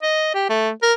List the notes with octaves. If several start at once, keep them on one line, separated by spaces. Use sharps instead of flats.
D#5
G4
A3
A#4